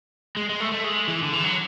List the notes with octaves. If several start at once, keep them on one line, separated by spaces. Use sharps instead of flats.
G#3
G#3
A3
A3
G#3
E3
D3
E3
F#3